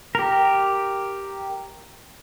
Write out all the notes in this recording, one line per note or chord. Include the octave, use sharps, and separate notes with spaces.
G4 A#4